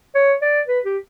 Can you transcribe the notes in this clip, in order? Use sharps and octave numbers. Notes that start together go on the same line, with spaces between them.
C#5
D5
B4
G4